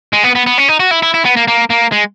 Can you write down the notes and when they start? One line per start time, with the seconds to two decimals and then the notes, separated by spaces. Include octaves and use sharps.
0.13 G#3
0.24 B3
0.35 B3
0.46 B3
0.58 C#4
0.68 D#4
0.80 F#4
0.91 E4
1.02 E4
1.14 E4
1.25 B3
1.36 A#3
1.48 A#3
1.70 A#3
1.92 G#3